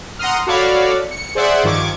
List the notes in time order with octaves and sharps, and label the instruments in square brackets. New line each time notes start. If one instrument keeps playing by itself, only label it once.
[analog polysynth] F#5 A#5 C6 D#6 F6
F#4 A4 C#5 D5 F5 B5
C#7
G#4 C5 D5 E5 F#5
G2 D#3 F3 C#6 D6 G#6